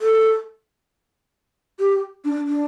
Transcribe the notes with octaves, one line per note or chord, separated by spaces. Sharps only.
A4
G4
D4
D4